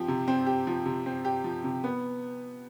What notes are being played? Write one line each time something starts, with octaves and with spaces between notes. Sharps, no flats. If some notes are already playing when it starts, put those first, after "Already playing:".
Already playing: F3 C4 G4
C3
C4
G4
F3
C3
C4
G4
F3
C3
B3